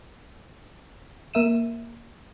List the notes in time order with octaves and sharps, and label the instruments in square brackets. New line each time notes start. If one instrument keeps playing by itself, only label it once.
[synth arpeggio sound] A#3 A#4 E5 D#7 E7